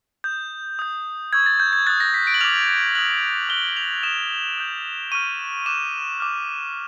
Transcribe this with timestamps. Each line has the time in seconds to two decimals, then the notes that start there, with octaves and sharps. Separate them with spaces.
0.24 D#6 G6
0.79 D#6 G6
1.33 C#6 E6 G6 G#6
1.46 A6
1.60 G6
1.73 G#6
1.87 F#6 A6
1.90 D#6
2.00 A#6
2.14 B6
2.27 D7
2.34 F#7
2.41 D6 F6 F7
2.95 D#6 F#6 F#7
3.49 D6 F#6 G7
3.77 F7
4.03 D#6 F#6 E7
4.57 D#6 G6
5.12 C#6 F6 D#7
5.66 D6 F#6 E7
6.20 D6 F6